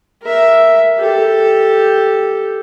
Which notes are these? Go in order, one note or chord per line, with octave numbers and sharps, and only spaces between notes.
A#4 E5
G4 A4